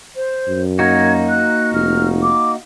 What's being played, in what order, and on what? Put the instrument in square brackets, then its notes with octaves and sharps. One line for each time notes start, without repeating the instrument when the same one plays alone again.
[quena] C5
[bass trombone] F#2
[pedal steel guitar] A#3 D#4 F#4 [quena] G#6
[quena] F#6
[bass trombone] F1 [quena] F6
[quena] D6